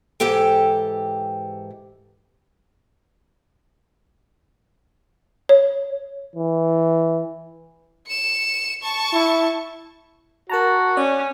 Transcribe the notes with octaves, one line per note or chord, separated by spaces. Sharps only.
G#2 E3 G4 A4 G5
C#5
E3
C#7 E7
A5 C#6
E4
F#4 A#4 A5 A#5
C#4 D5